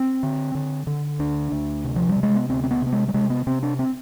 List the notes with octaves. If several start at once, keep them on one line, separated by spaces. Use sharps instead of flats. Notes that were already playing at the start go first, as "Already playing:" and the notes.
Already playing: C4
D3
D3
D3
D2 D4
D2
C3
F3
G3
C3
G#3
B3
D2 C4
C4
B3
C3 B3
G#3
G3
C3 G#3
B3
C3 C4
D4
C4